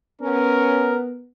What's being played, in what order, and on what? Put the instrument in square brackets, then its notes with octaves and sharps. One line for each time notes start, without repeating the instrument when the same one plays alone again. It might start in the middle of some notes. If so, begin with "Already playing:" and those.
[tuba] B3 [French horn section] C#4 [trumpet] A#4